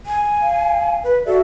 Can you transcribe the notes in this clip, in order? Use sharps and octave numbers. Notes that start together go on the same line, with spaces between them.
G#5
F5
B4
F#4 A4 D5 E5